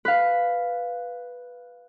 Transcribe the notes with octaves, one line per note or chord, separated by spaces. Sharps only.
B4 F5